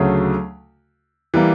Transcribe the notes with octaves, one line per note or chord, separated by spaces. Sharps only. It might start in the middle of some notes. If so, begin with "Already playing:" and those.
Already playing: D2 C#3 F#3 A3
E3 G3 A#3